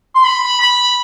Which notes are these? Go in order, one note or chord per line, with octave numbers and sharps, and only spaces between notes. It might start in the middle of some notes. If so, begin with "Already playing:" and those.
C6
B5
B5